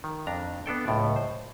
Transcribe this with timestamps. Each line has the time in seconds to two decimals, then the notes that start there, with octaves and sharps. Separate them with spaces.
0.04 D#3
0.27 F2 D4 A#5
0.66 B3 D4 A4 G5
0.86 C#2 A2 F3 D5
1.16 C5